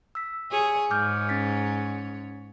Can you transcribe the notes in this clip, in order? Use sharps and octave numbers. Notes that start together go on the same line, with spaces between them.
E6 B6
G#4 C#5
G#2 C#5 D6 F6 G6
C#4 A6 B6